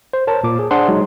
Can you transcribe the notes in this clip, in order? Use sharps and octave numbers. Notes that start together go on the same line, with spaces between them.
C5
A#4 C#5 A5
A#2 D6
G#4
D4 G#4 C5 F#5 C6
F#3 G#3 D#4